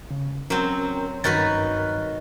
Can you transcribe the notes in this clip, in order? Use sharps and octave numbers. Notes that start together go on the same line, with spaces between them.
C#3
F#3 C4 C#4 A#4
G2 D#3 F#4 A#4 B4 A6